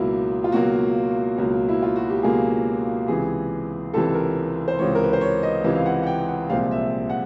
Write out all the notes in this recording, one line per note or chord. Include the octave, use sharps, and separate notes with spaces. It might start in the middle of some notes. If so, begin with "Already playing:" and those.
Already playing: C#2 B2 F#3 A#3 E4
F4
C#2 B2 F#3 A#3 F#4
C#2 B2 F#3 A#3
E4
F4
F#4
G4
C#2 B2 F#3 A#3 G#4
C#2 C3 E3 G#4
C#2 C3 E3 A4
A#4
C5
C#2 C3 E3 C#5
A#4
B4
C5
C#5
D#5
C#2 C3 E3
F5
F#5
F#5
G5
F#5
C2 A#2 F3 G#3 C4 F5
E5
F#5